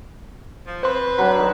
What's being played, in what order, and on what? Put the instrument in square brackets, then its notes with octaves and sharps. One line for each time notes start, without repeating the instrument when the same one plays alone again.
[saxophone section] F3
[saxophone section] C4 B4 [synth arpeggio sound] C5 C6
[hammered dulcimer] F#3 D4 [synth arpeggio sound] B6
[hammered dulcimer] D#3